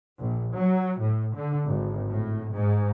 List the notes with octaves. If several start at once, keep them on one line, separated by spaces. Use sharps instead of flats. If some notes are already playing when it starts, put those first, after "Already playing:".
A#1
F#3
A2
D3
G#1
A2
G#2